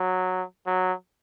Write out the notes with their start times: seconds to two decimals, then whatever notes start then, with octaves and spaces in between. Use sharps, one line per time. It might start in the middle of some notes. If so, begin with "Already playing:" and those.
Already playing: F#3
0.67 F#3